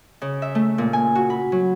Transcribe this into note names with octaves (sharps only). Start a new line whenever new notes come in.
C#3
E5
A3
A#2
G#5
F#4
B5
F#3